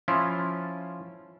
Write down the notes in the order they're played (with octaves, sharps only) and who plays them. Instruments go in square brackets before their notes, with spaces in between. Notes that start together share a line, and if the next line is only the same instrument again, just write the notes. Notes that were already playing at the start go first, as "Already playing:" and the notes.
[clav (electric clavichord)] F3 C#4 E4 F4